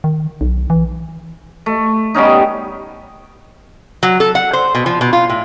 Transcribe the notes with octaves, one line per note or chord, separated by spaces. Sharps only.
D#3
B1
E3
A3
G3 B3 C#4 D#4
F#3
A4
F#5
C5
B2
F3
B2
F4
A2